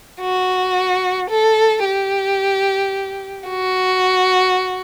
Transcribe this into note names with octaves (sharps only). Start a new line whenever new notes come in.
F#4
A4
G4
F#4